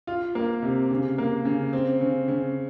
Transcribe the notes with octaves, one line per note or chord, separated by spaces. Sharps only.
F4
A#3
C3
C#3
A#3
C#3
C4
C#3
C#3